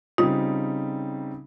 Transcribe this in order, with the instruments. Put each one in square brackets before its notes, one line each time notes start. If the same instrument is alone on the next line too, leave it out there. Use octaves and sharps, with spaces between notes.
[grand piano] C#3 G3 C4 D#4 [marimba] F4